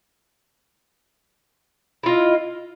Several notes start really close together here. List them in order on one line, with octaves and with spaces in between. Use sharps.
E4 F4 D#5